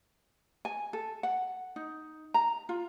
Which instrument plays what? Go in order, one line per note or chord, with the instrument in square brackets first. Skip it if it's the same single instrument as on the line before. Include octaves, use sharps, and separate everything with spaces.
[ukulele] G#5
A4
F#5
D#4
A#5
F4